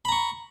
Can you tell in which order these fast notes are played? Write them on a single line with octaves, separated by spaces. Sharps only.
B5 A#5 C#6